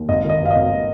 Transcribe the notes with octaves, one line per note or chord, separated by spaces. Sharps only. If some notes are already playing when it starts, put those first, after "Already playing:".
Already playing: D#2
G#1 D#5
D#3 D#5
G2
F5
D#5
G#1